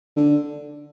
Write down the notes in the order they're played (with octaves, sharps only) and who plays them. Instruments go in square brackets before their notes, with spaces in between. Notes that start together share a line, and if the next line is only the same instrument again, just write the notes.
[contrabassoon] D3